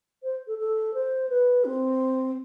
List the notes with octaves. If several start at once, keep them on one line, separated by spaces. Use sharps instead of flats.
C5
A4
A4
C5
B4
C4